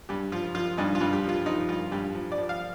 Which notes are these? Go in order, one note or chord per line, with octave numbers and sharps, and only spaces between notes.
G2 G4
F3 F4
F3 F4
G2 D#4
F4
G2
G4
F3 F4
F3 D#4
G2 F4
G2 G4
F3
D5
F3
F5